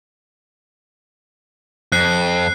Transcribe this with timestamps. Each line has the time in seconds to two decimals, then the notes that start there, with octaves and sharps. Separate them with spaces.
1.92 F2 F#6 C7